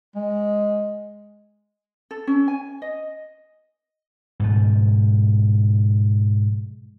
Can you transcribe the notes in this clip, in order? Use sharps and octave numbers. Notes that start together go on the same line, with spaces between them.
G#3
A4
C#4
G#5
D#5
G#2 B2 F3